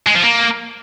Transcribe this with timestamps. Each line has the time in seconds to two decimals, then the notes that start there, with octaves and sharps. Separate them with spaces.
0.07 G#3
0.15 F3
0.24 A#3